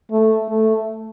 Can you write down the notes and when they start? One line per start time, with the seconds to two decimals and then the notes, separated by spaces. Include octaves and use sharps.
0.11 A3
0.48 A3